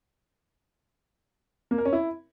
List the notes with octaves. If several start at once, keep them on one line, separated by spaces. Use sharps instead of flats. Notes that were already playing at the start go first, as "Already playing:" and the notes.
A#3
A#4
C#4
E4